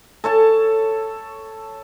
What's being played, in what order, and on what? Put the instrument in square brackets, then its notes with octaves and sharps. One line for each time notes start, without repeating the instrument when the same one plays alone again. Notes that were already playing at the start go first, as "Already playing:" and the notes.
[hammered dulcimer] A4 C#5 A5